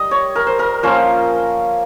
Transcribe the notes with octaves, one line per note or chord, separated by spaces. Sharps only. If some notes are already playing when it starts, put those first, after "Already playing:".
Already playing: G3 D#5
C#5
A#4
C5
A#4
F3 A#3 C#4 C5